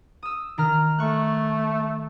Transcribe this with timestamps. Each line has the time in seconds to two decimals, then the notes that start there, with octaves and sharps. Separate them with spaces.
0.23 D#6 E6
0.58 D#3 A#5 F6
0.98 A3 C#6 F#6